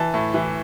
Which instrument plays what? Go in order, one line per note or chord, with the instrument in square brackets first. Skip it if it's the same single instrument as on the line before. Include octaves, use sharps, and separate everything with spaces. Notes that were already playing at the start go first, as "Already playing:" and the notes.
Already playing: [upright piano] E3 A5
A2
E3